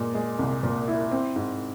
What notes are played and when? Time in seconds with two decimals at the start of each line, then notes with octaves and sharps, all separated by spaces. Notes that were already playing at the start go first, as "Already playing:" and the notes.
Already playing: A#2 G#3
0.14 G#3
0.39 C2
0.63 A#2
0.88 E4
1.11 C4
1.36 G#2